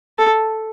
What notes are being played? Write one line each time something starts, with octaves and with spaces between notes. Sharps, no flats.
A4